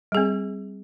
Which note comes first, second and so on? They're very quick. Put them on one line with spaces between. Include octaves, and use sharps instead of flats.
G3 G#4 C4